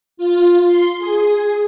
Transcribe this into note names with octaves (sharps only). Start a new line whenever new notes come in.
F4
C6
G#4